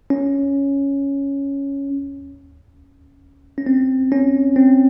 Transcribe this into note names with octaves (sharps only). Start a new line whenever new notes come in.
C#4
C#4
C4
C#4
C4